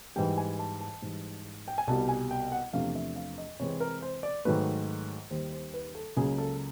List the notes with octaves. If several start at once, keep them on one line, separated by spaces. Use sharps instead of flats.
G#2 E3 G3 G5
G#5
A5
A5
G#2 E3 G3
G5
G#5
C2 B2 G3 A5
G#5
G5
F#5
E2 C3 F3 A3 D4 F5
E5
F5
D#5
C3 E3 G#3 C4 C#5
A#4
C5
D5
G#2 D#3 F#3 A3 B4
D#2 D#3 G3 C5
C5
B4
A4
C#2 C#3 F#3 A#3 G#4
A4